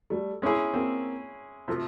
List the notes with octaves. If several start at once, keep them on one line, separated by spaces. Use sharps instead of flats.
G3 A3
G#3 C#4 E4 G#4
A#3 C4
C3 F3 A3